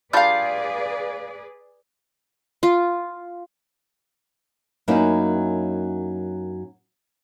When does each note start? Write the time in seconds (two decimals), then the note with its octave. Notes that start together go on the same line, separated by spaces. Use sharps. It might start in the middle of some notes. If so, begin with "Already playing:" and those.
0.13 G3 D4 F4 G#4 B4 D5 F5 G6
2.63 F4
4.88 F#2 F#3 A#3 C#4 D#4 E4